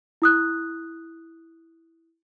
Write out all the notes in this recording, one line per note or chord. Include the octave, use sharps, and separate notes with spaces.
E4 D#6 F#6